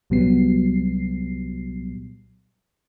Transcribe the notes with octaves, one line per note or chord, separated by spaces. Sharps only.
C2 A#2 F#3 G3 B3 C7